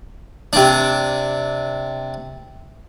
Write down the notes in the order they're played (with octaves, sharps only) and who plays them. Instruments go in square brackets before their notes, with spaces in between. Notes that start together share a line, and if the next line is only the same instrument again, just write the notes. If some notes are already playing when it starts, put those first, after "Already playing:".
[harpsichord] C3 D4